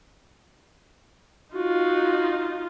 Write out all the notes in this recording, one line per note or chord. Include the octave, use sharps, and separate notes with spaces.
D#4 F4 F#4